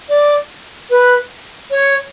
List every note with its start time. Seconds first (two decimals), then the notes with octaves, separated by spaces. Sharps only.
0.09 D5
0.90 B4
1.71 C#5